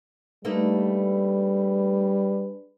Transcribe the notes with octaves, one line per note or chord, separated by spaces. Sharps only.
G3 A3 A#3 D4 D#4 G#4 B4